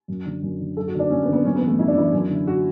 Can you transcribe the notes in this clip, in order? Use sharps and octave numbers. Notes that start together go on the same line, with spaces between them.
F#2
D3
F#2
D3
F#2 A4
F#4
D3
D4
F#2 C#4
B3
D3
B3
F#2 C#4
B3
E3
A3
F#2 E4
D4
E3 E4
F#2
D3
F#4